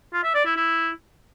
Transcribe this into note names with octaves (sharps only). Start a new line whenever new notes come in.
F4
E5
D5
E4
E4